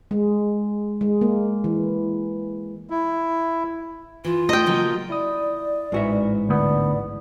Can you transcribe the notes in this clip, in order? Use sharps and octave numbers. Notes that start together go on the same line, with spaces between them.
G#3
G#3
A#3
E3
E4
E3 F4
A3 D#5 G5
C#3 F#3 A#3
E4 D5 D#6
A1 G#2 E3 G#3 F#4 E5
D2 B3 D5